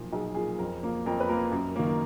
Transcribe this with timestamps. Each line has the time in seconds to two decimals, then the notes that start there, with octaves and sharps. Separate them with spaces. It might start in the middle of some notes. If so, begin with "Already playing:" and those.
Already playing: B1 A#2 F3
0.13 B1 G#4
0.34 A#2 F3 G#4
0.59 F2 A#4
0.83 F3 A#3
1.06 F2 A#4
1.20 B4
1.29 F3 A#3 A#4
1.52 F#2
1.76 D#3 A#3